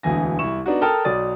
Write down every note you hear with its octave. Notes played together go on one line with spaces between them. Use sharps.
E1 D2 E3 G#5 A#6
C2 E4 C#6 E7
B3 D4 D#4 F#4
A4 A#4 G5 A5 D#6 F6
B1 F#3 D5 D#6 A6